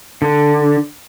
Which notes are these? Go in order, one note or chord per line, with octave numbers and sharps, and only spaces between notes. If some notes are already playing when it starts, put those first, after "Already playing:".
D3